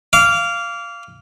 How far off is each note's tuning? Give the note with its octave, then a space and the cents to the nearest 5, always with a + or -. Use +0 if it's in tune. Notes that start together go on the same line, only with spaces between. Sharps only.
F5 -10 D6 -30